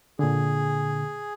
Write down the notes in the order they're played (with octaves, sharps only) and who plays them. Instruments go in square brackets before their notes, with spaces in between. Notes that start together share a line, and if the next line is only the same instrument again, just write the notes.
[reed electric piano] A#2 D3 [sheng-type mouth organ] G#4